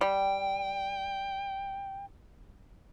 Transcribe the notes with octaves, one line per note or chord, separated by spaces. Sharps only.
G3 G5